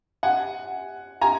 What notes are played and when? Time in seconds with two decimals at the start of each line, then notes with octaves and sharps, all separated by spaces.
0.23 F#5 G#5
1.21 G#5 A#5